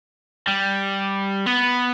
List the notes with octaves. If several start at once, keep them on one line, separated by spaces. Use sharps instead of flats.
G3
B3